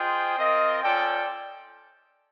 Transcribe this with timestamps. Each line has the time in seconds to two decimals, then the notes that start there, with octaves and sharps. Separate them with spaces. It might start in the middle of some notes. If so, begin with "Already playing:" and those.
Already playing: F4 G#4 C5 D#5 G5
0.38 C4 F4 A#4 D#5
0.82 C#4 F4 A4 D5 G5